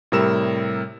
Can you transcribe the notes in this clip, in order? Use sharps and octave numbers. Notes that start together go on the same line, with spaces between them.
A2 C3 G3 A#4 E6 E7